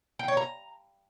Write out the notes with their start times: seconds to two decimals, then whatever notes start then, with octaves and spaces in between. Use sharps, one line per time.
0.19 G5
0.28 C#5
0.37 A#5